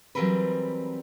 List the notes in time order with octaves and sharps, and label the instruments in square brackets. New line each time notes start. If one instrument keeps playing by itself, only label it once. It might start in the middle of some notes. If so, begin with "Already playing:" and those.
[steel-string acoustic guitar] E3 F#3 G3 C4 A#4 B4